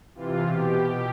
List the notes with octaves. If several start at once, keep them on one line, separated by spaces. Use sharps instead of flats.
C3 E3 F4
B2 G4
B2